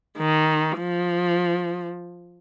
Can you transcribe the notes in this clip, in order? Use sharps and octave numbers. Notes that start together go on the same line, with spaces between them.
D#3
F3